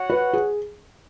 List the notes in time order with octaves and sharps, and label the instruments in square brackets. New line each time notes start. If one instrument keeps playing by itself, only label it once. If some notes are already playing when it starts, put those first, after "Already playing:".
Already playing: [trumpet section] F#4 C#5 F#5
[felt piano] B4
G#4